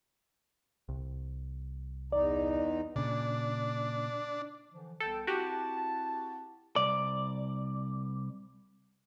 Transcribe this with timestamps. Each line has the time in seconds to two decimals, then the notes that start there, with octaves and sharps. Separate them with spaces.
0.89 C2
2.12 E2 D#4 D5
2.96 A#2 C#3 D4
4.70 D3 E3 F3
5.00 C2 B3 A4 G5
5.27 C4 E4 F#4 G4 A5
6.76 C2 D5